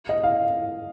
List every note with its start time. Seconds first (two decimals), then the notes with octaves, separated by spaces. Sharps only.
0.09 D#5
0.23 F5